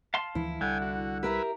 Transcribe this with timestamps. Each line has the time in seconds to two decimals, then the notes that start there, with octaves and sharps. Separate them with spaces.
0.14 F5 A5 C6
0.35 D2 E3 F3 E4
0.61 C2 D3 G3 G5 G#5
0.82 F#4
1.23 E4 G4 A#4 B4 E5